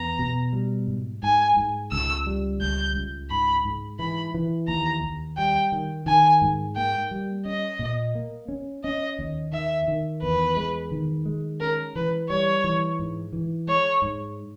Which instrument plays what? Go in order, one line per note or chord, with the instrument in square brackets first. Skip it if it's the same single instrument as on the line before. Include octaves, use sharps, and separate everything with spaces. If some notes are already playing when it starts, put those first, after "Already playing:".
Already playing: [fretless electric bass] E2 B3 [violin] A#5
[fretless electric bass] B2
G3
G#2
[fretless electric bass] G#2 [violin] G#5
[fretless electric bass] G#2
[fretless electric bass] C#2 [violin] E6
[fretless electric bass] G3
[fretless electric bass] C#2 [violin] G6
[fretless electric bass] C#2
[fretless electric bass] G#2 [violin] B5
[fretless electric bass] G#2
[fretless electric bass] E3 [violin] B5
[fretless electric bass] E3
[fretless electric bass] D#2 [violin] A#5
[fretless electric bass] D#2
[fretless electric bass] G3 [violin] G5
[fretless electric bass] D#3
[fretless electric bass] D#3 [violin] G#5
[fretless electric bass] G#2
[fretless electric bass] A#3 [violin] G5
[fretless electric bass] G3
[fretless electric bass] C#4 [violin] D#5
[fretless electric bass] A#2
A#3
C#4
[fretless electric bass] C#4 [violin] D#5
[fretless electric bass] D#2
[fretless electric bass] D#3 [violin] E5
[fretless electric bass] D#3
[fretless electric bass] E2 [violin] B4
[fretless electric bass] G#3
D#3
G#3
[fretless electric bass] C#4 [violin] A#4
[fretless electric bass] E3 [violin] B4
[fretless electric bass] G3 [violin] C#5
[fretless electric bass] E3
G#2
E3
[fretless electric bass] G#3 [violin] C#5
[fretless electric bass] G#2